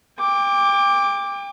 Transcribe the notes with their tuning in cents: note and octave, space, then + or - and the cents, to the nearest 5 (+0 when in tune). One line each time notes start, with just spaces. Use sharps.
G5 +35 D6 +0